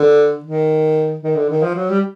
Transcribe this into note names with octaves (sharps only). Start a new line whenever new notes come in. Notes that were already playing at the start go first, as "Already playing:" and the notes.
Already playing: D3
D#3
D#3
D3
D#3
F3
F#3
G3